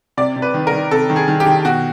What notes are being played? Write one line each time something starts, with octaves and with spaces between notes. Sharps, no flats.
C3 D5
C3
B4
D#3
A#4
D#3
C3 A4
D#3
G#4
D#3
G4
D#3
B2 F#4